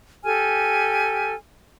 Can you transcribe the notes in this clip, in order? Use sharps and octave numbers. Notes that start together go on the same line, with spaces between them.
G4 A4 G#5 F6